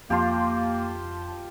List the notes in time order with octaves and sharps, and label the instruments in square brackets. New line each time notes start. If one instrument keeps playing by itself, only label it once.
[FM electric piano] F2 A5 C6 [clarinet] A#3 [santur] F4 G4